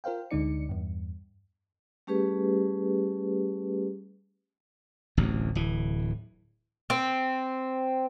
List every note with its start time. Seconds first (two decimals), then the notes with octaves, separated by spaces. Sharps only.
0.04 F4 A#4 C5 F5 G5
0.31 D2 D3 G#3 D#4 D5 C#7
0.69 E2 G2
2.07 G3 A3 C#4 G4 G#4 B4
5.17 D1 A1 D2
5.55 D1 E3
6.90 C4